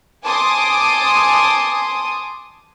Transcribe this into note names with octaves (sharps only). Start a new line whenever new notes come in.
G#5 A5 C6 D6 D#6